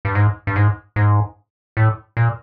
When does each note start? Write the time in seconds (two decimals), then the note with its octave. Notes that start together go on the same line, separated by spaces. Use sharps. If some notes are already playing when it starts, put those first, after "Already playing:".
0.05 G2
0.15 G#2
0.47 G2
0.56 G#2
0.96 G#2
1.77 A2
2.17 A#2